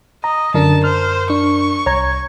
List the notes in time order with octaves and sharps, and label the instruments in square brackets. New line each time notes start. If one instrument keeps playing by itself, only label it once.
[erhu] D#5 [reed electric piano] A#5
[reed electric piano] F#2 A#4 [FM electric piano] D3 D4 [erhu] A5
[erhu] C5 [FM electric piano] F6
[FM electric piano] D4 [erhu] C#6
[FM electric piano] C2 G#6 [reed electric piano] C#5 A#5